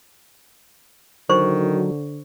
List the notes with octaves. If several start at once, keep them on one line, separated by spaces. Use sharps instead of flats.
D3 D#3 F#3 C5 C#6